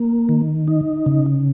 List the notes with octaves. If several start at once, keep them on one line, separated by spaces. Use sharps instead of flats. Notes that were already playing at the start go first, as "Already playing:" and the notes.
Already playing: A#3
D#3
D#4
C#3